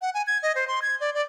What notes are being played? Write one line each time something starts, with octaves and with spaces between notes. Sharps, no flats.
F#5
G#5
G#6
D#5
C5
C6
G#6
D5
D5